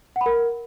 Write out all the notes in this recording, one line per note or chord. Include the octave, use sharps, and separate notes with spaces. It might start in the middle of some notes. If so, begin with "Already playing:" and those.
F#5
B5
A#4